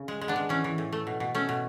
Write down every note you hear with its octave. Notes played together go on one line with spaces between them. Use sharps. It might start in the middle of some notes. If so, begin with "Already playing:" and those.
Already playing: C#3
G#3
G#3
B3 D4
G#3
E3 C#4
E3
A2
A3
B2
B2
A3 C#4
B2